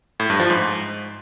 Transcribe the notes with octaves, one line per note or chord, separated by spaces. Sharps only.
A2
G2
F3
G#2